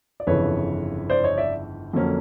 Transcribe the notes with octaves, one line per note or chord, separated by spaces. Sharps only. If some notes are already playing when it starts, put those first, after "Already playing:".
D5
G1 F2 C#3 E3 B4 C#5
C5 D5
C#5 D#5
D5 E5
F2 D3 F#3 A#3 C#4